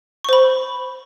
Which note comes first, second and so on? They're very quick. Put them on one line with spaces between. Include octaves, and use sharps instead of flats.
C#6 C5 B5